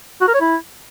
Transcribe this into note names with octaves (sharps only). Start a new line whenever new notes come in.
F#4
A#4
C#5
E4